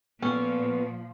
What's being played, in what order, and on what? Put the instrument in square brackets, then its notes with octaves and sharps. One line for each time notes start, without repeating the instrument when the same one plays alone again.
[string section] A#2 [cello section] F3 [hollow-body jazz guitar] B3 A4 [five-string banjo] C#4